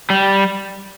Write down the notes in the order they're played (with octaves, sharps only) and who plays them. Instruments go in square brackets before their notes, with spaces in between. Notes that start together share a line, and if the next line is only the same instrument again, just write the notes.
[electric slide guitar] G3